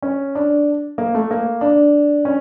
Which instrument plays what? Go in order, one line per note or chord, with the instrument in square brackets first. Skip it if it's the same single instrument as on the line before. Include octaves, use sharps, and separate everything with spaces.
[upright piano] C#4
D4
A#3
A3
A#3
D4
C#4